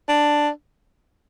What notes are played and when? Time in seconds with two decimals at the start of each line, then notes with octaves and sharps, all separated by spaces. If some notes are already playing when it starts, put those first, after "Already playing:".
0.09 D4